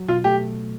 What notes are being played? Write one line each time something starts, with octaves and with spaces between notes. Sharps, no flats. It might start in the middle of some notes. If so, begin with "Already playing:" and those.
Already playing: F#3
B2 F4
A3 G4